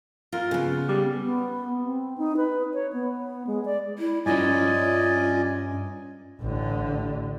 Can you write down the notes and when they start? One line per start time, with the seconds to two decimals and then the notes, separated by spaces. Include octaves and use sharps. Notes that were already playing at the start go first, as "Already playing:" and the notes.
0.32 F4 A#4
0.51 C#3 B3
0.89 G3
1.23 B3
1.83 C4
2.18 D#4
2.37 B4
2.73 C#5
2.93 B3
3.47 G#3
3.65 D5
3.99 E4
4.26 G2 C#4 F4 D5 D#5 G#5
6.41 A1 D3